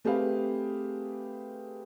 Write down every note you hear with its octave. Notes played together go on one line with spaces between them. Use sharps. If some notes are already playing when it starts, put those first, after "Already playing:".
A3 C4 G4 G#4 B4 F5